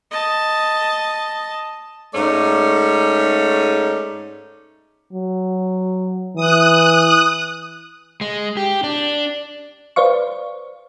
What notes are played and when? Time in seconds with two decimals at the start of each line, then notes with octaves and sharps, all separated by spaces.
0.11 D#5 A5
2.14 G#2 A3 C#4 D#4 D5
5.13 F#3
6.36 E3 D#6 F#6
8.21 G#3
8.57 G4
8.84 D4
9.96 B4 C5 D5 F5 C#6